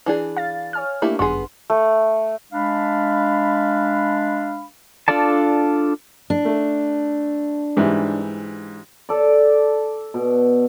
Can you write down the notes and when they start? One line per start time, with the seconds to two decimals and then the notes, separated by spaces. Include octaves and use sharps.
0.06 E3 D4 G#4
0.37 F5 A6
0.73 C#5 G#5 F6
1.02 A3 A#3 D4 E4 G4
1.19 G1 F#2 B3 G#4 C6
1.70 A3
2.53 G#3 D4 F5 B5
5.08 D4 F4 A4 D5 A5
6.30 D4
6.45 A3
7.77 G#2 E3 G3
9.09 A4 D5
10.14 B2